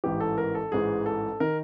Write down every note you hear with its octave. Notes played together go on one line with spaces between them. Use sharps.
A1 G#2 E3 G4
A4
A#4
A4
A1 G#2 E3 G#4
A4
D#3 A#4